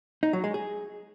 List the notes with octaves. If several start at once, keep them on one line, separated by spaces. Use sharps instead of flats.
D#4
F#3
G#3
G#4